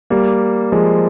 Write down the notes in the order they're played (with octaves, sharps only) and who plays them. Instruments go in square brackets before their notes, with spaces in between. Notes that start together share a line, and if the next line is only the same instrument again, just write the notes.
[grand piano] G3 A#3
F3 G#3